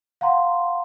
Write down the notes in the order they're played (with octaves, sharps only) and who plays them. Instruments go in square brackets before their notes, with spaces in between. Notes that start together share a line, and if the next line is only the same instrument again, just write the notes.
[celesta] F5 F#5 A#5 C6